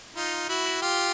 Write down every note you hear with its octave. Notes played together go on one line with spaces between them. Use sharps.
D#4 F4
E4 F#4
F4 G4